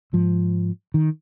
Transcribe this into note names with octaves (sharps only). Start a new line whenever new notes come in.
G#2 F3
D#3